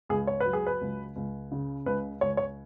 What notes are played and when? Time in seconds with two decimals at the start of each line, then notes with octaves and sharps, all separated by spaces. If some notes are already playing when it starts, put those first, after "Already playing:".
0.09 C#2 G#4
0.27 C#5
0.40 F#3 B4
0.53 G#4
0.67 B4
0.81 C#2
1.16 C#2
1.52 C#3
1.86 C#2 B4
2.21 C#2 C#5
2.37 C#5